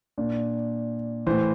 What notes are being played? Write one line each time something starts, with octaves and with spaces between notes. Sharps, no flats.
A#2 D4
A2 E3 C5